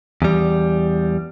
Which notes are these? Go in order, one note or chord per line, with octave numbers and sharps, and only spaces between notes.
E2 G3